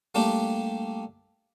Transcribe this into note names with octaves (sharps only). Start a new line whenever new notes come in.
G3 A3 A#3 D4 G4